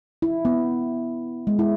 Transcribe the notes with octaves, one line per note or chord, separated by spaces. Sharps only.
E4
B3
G#3
E4